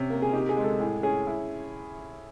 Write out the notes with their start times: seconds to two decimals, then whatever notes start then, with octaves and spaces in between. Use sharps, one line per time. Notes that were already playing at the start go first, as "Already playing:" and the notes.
Already playing: C3 C#4
0.10 A#3
0.22 G#4
0.33 D#4 G4
0.49 G#4
0.57 G#3
0.64 A4
0.80 A2 G#4
1.03 C#4 G#4
1.27 E4